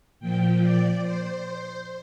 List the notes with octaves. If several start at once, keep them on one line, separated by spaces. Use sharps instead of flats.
A#2 F3 G5
D5
C5